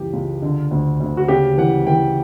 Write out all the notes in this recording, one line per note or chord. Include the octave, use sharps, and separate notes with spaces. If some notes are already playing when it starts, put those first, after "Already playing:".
Already playing: C#2 F#2 E3 G4
C#2
D3
D2
D2
F#4
C#3 G4
E3 F#5
E3 G5